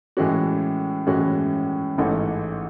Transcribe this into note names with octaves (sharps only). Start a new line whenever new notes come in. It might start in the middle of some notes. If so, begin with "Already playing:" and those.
A2 E3 G#3 C#4 F#4
A2 E3 G#3 C#4 F#4
A1 G#2 E3 A3